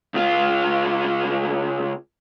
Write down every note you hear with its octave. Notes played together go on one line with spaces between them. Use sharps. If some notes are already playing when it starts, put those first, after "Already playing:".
C#2 F4